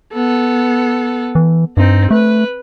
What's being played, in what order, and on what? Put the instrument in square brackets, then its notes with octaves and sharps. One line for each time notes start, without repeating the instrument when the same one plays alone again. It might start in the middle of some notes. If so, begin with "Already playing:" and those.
[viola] B3 A4
[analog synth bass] E3
[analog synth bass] G2 [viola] C4 D#4
[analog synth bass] A3 [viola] B4